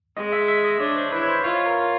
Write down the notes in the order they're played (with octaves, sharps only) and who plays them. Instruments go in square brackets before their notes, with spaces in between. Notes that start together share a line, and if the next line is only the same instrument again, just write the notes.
[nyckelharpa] G#3 [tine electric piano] D#5
[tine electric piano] E5
E5
D#5
[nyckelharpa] D4 [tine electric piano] C#5
[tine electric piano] C5
[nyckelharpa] E4 [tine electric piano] B4
[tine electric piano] C#5
C5
[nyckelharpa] F4 [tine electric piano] C#5
[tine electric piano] A#4